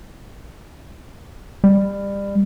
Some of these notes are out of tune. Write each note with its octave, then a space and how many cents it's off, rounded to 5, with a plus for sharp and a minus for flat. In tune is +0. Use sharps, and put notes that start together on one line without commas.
G3 +25